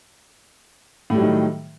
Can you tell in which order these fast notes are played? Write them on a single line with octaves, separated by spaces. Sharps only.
A2 G3 F#3 D#3